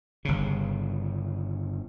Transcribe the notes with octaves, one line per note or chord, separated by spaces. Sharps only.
G1 C#3